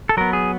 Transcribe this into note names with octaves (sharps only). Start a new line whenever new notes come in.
A4
F#3 B3 A#4
G#4